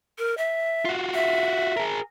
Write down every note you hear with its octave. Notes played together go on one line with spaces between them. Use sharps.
A#4
E5
F4 F#4
E5
G#4 A#4